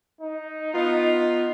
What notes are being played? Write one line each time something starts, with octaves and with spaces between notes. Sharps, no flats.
D#4
B3 F4
D#4